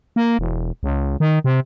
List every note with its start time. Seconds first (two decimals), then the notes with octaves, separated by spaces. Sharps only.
0.16 A#3
0.39 E1
0.83 C#2
1.20 D#3
1.44 C3